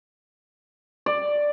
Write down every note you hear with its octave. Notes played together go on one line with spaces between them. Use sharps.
D5